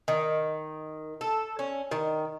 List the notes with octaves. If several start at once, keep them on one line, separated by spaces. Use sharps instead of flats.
D#3
A4
C#4
D#3